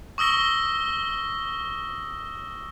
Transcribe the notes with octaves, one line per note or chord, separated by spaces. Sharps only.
C#6 D#6 E6 A#6 G7